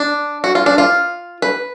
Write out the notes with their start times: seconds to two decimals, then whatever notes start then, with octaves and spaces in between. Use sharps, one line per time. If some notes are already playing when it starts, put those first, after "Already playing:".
Already playing: D4
0.44 F#4
0.55 F4
0.66 D4
0.78 F4
1.42 B4